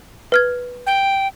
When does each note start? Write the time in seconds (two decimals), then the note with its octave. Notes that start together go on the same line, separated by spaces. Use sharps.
0.32 B4 F6 G#6
0.87 G5